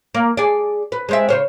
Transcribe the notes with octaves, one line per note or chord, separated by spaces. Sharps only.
A#3
G#4 D5
B4
G#3 C4 E5
C#3 C5 C#5